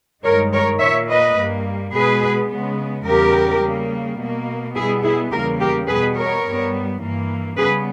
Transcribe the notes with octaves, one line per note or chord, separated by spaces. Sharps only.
G2 D#3 G#3 A#4 C#5
A#4 C#5
A#2 A#3 C#5 E5
B4 D#5
G2 G3 A#3
B2 G#3 B3 G#4 B4
C#3 G#3 B3
E2 C#3 G3 B3 G4 A#4
C#3 G3 A#3
B2 A#3
B2 G3 B3 E4 G#4
E4 G#4
E2 C#3 E3 G3 A#3 G4 A#4
G4 A#4
B2 G3 B3 G#4 B4
A#4 C#5
G2 G3 B3
G2 E3 A#3
C#3 G3 B3 G#4 B4